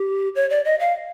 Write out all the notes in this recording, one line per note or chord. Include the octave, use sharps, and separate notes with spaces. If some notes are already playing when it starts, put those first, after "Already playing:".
Already playing: G4
C#5
D5
D#5
F5